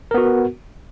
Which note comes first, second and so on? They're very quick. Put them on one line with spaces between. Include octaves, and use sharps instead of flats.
A#4 B3 F#4